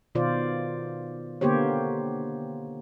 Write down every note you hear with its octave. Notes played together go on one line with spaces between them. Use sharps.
B2 D#3 F4 C5 D5
D3 A#3 B3 G4 C5 C#5